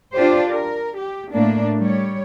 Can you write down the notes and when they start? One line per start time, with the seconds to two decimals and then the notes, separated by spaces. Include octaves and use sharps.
0.15 D4 F4 G4 C5
0.52 A#4
0.97 G4
1.33 A2 A3 A#3 D4
1.79 G3 C#5